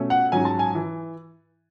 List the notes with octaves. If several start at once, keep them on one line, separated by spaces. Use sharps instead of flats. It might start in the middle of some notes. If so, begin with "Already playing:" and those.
Already playing: B2 A3 C#4
F#5
G#2 F#3 C#4 G#5
A5
G#5
E3